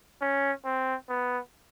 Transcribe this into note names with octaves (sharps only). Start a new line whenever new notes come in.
C#4
C4
B3